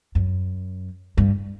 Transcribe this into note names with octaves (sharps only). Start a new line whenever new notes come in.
F#2
G2